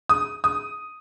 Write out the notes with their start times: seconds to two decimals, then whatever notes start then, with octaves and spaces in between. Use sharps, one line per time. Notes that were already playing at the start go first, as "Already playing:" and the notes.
0.09 D#6
0.44 D#6